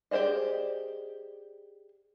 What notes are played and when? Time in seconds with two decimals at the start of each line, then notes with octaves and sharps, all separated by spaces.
0.11 G4 G#4 C5 D5 D#5